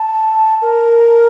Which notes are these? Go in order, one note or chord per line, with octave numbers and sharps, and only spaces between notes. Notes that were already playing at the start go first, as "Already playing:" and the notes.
Already playing: A5
A#4